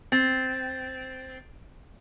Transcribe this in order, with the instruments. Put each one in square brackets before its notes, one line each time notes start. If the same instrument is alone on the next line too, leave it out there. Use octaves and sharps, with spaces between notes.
[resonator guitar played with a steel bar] C4 [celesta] A6